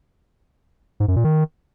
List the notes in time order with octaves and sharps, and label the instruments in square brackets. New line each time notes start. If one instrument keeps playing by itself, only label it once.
[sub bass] G#2
F#2
A#2
D#3